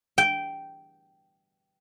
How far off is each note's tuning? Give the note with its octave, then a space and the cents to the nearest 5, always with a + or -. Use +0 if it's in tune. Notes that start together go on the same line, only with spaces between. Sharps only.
G5 -10